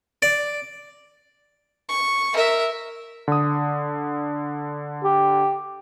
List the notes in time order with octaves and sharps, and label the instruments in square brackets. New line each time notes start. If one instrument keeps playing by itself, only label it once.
[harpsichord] D5
[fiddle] C#6
A#4 E5
[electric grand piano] D3 D#6
[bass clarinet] G4